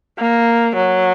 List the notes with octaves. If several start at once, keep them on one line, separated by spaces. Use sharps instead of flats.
A#3
F#3